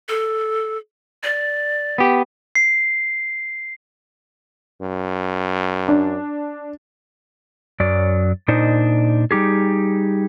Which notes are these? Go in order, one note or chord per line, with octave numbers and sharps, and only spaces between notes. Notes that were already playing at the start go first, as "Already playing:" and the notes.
A4
D5
B3 G4
C7
F#2
D4
F#2 F#3 D5
A#2 D4 D#4 C5 D#5
G3 D#4 G4 G#4